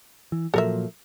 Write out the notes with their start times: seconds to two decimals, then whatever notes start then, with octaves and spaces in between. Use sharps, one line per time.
0.32 E3
0.54 A#2 F3 F#3 A4 A#4 E5